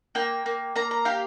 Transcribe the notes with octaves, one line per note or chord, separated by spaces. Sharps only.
A#3 G5
A#3
A#3 A#5
A#5
G4 F5